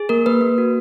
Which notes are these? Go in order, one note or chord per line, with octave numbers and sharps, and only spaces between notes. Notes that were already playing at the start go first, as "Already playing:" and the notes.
Already playing: G#4
A#3 A#4
A#3 B4
A#3
F#4